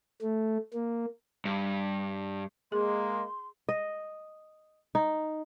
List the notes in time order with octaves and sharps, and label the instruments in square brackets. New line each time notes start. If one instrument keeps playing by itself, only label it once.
[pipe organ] A3
A#3
[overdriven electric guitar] G2
[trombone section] G#3 A#3 [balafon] G#4 [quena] C6
[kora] D#5
D#4